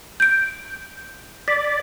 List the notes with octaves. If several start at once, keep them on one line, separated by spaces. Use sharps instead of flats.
G6 D7
D5 B6